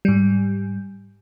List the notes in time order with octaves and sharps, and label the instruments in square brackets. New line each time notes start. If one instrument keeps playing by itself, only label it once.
[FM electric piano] G#2 G3